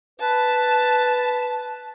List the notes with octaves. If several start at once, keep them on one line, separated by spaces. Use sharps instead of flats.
B4 A5